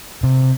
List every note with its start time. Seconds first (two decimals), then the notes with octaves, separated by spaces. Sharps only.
0.23 C3